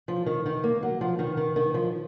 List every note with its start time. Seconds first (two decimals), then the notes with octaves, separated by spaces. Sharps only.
0.08 F3
0.26 D#3
0.46 D#3
0.64 A#3
0.83 F#3
1.01 F3
1.19 D#3
1.37 D#3
1.56 D#3
1.74 F3